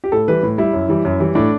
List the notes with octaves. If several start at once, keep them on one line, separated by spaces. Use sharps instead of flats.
G4
A2 A4
E3 G3 B4
A2
G3 E4
F#2
E3 G3
F#2
E3 G3
A2 D4